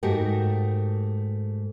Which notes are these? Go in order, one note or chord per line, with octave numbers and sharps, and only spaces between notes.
G#2 A3 F#4 G4 A#4